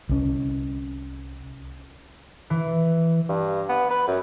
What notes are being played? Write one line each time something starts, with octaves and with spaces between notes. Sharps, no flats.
C2 C#4
E3
G2
B3
B4
F#2